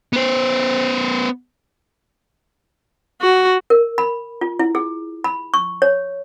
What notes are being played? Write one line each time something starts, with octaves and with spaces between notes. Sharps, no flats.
B3 C5
F#4
A#4
B5
F4
E4
G#4
B5
C#6
C#5